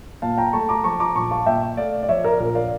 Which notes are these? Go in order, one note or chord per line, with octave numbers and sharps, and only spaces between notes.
A#2 F5 A5
G5 A#5
A3 A5 C#6
A#5 D6
F3 A5 C#6
A#5 D6
A#1 A5 C#6
F5 A5
A#2 E5 G5
A3 D5 F5
D5
F3 C#5 E5
A#4 D5
A#1 A#4
D5 F5